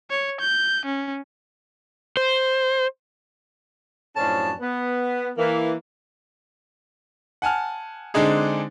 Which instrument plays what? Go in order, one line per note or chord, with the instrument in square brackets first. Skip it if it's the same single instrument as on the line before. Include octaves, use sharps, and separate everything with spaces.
[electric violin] C#5
G6
C#4
[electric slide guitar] C5
[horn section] F#2 A2 F3 C#4 D4 A5
B3
E3 A#3
[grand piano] F#5 G#5 A5 F6
D3 G#3 C4 D4 D#4 G#4